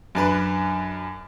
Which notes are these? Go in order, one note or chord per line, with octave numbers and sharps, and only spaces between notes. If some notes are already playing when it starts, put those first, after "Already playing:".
F#2 D4 B4